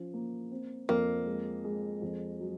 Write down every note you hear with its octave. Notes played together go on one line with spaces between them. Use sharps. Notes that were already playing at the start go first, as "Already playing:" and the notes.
Already playing: F3 C#4
A#3
C4
F2 A#3
G#3
G#3
F2
F#3